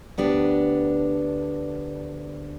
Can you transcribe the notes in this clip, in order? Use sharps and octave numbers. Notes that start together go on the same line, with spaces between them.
D2 B3 D4 G4